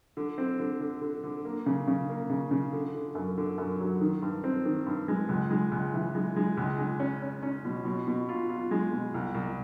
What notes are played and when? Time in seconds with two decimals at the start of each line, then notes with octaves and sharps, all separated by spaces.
0.17 D3
0.38 C4
0.59 D3
0.80 D3
1.01 D3
1.23 D3
1.45 A#3
1.66 C#3
1.87 C#3
2.09 A#3
2.30 C#3
2.51 C#3
2.73 D3
2.95 D3
3.15 F#2
3.38 D3
3.58 F#2
3.80 F#3
4.01 D#3
4.22 G2
4.44 C4
4.65 D#3
4.86 G2
5.08 G#3
5.29 C#2
5.51 G#3
5.72 C#2
5.94 E3
6.15 G#3
6.36 G#3
6.57 C#2
6.79 G#3
7.00 C#4
7.22 C#4
7.42 C#4
7.65 B2
7.85 B2
8.07 B2
8.29 F4
8.49 F4
8.71 G#3
8.92 B2
9.14 C2
9.35 C2